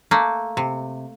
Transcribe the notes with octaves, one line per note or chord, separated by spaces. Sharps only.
A3 A#3
C3